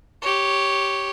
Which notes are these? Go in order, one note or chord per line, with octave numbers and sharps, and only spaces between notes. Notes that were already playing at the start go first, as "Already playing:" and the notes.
G4 C#5